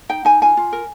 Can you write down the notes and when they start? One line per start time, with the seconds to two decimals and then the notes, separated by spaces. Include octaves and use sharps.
0.09 D#4 G5
0.25 D#4 G#5
0.41 F4 G#5
0.57 F4
0.73 A#4